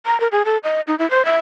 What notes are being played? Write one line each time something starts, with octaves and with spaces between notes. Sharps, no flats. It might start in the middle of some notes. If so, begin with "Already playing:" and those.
A#5
A#4
G#4
A4
D#5
D#4
E4
C5
E5